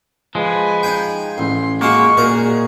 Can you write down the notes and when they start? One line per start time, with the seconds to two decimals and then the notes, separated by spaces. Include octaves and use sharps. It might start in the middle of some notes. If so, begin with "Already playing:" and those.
0.35 F3 G#3 B4 G#5
0.83 D#4 G5
1.38 A1 C6
1.81 G#3 A#3 F4 F#4 F#5 C#6
2.17 A#2 F#4 G#4 A#4 D#5